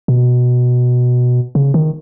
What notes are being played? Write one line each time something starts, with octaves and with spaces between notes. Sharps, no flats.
B2
C#3
D#3